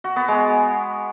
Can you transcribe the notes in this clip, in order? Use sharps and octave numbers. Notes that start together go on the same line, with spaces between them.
F#4
B3
G#3